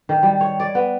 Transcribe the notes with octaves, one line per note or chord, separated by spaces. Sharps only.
D#3
G3
C#5
D5
B3